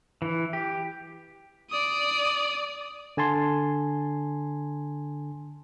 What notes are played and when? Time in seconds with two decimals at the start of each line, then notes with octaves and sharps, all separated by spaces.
0.22 E3
0.53 G4
1.70 D5 D#6
3.17 D3 G#5 A5 C6